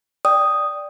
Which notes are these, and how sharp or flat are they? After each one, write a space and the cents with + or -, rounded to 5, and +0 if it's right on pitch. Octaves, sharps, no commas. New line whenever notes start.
D5 +0 G5 +0 D#6 +0